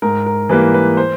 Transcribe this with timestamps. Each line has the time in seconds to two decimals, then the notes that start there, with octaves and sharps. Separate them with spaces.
0.02 G#2 A#4
0.26 A#4
0.49 E3 G3 A#3 B4
0.74 B4
0.97 C5